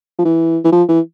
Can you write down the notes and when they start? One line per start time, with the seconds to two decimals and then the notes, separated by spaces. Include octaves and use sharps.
0.19 F3
0.25 E3
0.64 E3
0.72 F3
0.88 E3